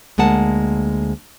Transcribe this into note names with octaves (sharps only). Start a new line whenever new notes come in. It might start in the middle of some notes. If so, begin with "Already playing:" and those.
D2 G#3 A#3 F#5 A5